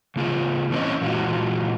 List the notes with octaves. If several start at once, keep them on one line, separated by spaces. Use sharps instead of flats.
C#3 A#3 F4 G#4
E3 A#3 C4 C#4 C5 D#5
A#2 E3 G#3 F4 F#4